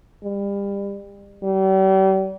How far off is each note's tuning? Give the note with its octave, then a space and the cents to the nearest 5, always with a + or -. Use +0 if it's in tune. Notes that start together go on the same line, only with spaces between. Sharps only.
G3 +30
G3 -40